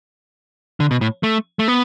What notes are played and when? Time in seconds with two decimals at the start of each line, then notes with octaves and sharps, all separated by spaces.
0.80 D3
0.91 B2
1.01 A2
1.23 A3
1.59 A3
1.68 B3